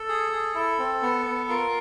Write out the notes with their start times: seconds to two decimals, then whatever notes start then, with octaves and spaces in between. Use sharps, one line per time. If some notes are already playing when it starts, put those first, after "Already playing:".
Already playing: A4
0.09 G#4
0.32 G#4
0.55 E4 A4
0.79 C4
1.02 B3
1.26 B3
1.49 F4 A#4